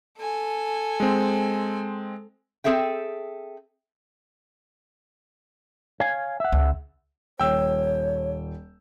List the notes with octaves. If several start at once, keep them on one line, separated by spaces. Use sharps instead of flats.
A4 G#5
G#3 C4
C4 G#4 A4 E5 G5
C#5 F5 G#5
E5 F#5
C#2
D#1 C#5 G5 E6 G6